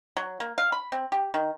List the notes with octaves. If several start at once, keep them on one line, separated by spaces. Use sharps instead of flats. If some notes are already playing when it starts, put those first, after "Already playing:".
F#3
A#3
F5
B5
C4
G4
D#3